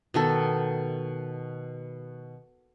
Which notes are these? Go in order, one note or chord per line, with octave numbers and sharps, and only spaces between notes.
B2 D#3 A4